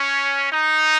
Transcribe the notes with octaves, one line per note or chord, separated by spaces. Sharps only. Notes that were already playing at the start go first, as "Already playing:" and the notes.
Already playing: C#4
D#4